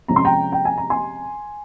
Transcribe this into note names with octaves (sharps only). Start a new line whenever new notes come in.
C3 F3 G#3 C#4 A#5
C6
G5 A#5
G5
G#5
A#5
G#5 C6